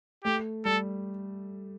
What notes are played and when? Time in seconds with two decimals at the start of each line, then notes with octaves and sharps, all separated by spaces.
0.24 A3 G4
0.65 G3 A4